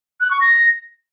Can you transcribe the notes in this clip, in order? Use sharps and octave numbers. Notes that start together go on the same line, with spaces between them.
F#6
C#6
A#6